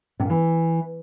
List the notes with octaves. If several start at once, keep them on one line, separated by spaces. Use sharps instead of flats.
C3
A#2
E3